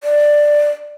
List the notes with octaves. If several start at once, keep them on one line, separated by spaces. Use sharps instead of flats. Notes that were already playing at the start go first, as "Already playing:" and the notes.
D5